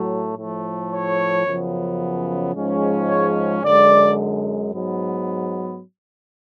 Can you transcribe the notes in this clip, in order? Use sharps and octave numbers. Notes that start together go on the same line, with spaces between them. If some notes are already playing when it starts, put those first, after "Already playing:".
Already playing: A2 F#3 A3
A2 F3 A3
C#5
F#2 C#3 F3 B3
G#2 F3 G#3 C#4
C#5
F#2 D3 G#3 D5
G#2 F#3 B3